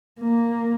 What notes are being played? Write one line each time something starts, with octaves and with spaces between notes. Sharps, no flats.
A#3